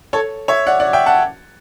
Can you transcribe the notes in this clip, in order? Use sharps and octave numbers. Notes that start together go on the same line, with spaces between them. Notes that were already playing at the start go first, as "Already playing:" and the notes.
A4 C#5
C#5 E5
D5 F#5
D5 F#5
E5 G5
F#5 A5